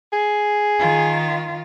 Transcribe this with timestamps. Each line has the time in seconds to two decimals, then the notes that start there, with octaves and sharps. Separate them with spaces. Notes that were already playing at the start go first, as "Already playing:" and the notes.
0.13 G#4
0.79 D#3 F4